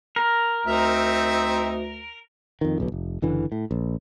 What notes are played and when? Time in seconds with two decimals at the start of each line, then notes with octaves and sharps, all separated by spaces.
0.16 A#4
0.66 D2 C4 D#4 E5
2.61 F2 D#3
2.78 D1 B1 B2
2.92 F1
3.22 F#1 D3 E3
3.52 A2
3.71 A#1